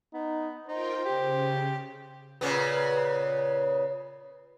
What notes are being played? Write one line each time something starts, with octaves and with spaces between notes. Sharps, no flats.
B3 D#4
D#4 F4 A#4 C5 G5
C#3 G4
A#2 C#3 B3